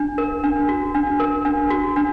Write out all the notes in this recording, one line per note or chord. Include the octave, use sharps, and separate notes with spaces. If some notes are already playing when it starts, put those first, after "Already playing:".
Already playing: D4
A#4
D4
F#4
D4
A#4
D4
F#4
D4